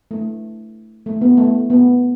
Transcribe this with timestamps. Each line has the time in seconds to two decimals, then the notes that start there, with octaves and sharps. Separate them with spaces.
0.11 A3
1.06 A3
1.21 B3
1.37 A3
1.70 B3